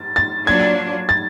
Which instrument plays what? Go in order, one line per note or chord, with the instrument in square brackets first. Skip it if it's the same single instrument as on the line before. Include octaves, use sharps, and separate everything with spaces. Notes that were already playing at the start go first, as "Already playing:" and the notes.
Already playing: [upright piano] A6
A6
[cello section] F#3 A#3 D4 F4 [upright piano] G#6
[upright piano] A6